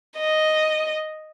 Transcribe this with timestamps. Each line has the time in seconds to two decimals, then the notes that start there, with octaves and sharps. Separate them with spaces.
0.19 D#5